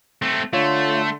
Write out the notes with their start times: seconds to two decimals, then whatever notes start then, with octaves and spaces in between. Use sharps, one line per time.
0.22 A3 C4
0.53 D3 A3 F4 C#5 C6